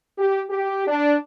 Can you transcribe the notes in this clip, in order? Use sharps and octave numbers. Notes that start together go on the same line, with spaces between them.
G4
G4
D4